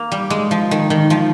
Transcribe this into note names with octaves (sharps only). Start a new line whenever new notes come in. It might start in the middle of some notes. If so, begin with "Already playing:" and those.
Already playing: A#3
G3
G#3
F3
D#3
D#3
F3